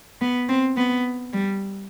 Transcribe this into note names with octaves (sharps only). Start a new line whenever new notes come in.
B3
C4
B3
G3